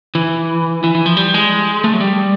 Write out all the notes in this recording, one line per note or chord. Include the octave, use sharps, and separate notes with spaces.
E3
E3
E3
F3
G3
G#3
A3
F#3
G3